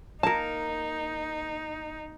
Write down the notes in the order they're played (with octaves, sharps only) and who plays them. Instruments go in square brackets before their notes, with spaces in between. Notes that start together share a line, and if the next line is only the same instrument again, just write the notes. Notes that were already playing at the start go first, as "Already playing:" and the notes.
[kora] A#3 A#4 [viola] D#4 [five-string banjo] A5